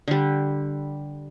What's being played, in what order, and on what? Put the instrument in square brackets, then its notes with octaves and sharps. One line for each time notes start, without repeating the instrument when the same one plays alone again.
[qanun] D3 G3